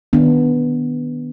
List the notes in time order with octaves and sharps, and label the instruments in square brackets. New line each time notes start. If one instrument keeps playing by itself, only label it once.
[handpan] D#3 B3 D4